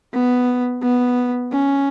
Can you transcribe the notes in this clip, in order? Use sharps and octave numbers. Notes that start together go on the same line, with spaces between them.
B3
B3
C#4